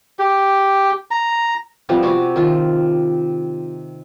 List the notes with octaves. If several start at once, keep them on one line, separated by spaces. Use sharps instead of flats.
G4
A#5
F3 G3 B3 C4
C3 F#4 G#5 D6
D#3 F4